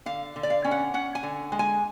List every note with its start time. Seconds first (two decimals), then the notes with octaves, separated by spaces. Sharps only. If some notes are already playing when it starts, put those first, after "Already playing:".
0.06 D3 F5
0.36 D3
0.43 D5
0.50 F5
0.64 C#4
0.71 F#5
0.94 C#4 F#5
1.15 G#5
1.23 D3
1.52 G#3
1.59 G#5